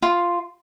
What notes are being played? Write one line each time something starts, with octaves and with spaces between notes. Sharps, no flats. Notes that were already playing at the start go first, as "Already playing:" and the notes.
F4